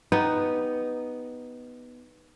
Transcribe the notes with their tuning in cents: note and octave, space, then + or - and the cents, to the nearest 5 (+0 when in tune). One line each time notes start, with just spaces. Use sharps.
B3 +0 D#4 +0 G4 +0